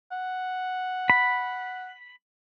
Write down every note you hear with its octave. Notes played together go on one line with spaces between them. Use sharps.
F#5
B5